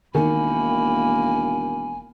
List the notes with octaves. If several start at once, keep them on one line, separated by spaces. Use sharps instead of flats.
E1 D#3 A#3 G#5 B5